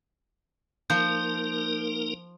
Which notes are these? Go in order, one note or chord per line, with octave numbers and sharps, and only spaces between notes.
F3 A#3 D#4 A#4 G6